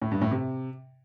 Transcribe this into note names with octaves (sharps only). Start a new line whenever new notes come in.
A2
G2
A2
C3